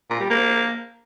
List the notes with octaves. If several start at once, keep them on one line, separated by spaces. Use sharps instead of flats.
A#2
G3
A#3